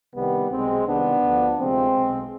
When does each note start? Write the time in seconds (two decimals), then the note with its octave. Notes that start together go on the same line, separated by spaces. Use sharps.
0.14 C2 C3 D#3 G3 B3
0.50 B1 B2 G#3 C4
0.86 C2 C3 D#3 B3 D4
1.22 D2 D3 F3
1.58 D2 C3 F3 G#3 C4
1.94 B1 B2